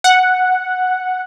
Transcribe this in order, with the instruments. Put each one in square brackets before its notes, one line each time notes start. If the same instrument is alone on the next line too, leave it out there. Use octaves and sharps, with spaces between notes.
[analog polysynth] F#5